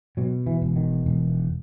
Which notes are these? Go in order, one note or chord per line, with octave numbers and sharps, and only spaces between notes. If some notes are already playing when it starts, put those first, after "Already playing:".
B2 F#3
E3
E1
D#3
E1